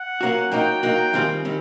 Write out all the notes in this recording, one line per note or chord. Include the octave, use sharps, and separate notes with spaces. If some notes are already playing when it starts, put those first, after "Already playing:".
Already playing: F#5
F#3 A#3 C#4 F#4
F#3 A#3 D#4 F#4 G5
F#3 A#3 D#4 F#4
D#3 G3 C4 F4 G#4
D#3 G3 C4